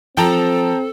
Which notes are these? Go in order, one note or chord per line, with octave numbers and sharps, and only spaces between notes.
F3 C4 A4 G5 A5 A#5